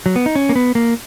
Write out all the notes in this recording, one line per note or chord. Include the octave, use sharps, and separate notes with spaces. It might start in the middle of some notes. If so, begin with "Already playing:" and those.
F#3
B3
D#4
C#4
A#3
B3
A#3